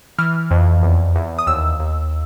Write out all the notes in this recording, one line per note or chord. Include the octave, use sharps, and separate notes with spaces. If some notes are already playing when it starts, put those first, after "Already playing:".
E3 F6
F2
E2
E2
D#6
D#2 E6
D#2